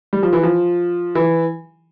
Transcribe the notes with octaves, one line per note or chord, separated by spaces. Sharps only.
G3
F3
E3
F3
E3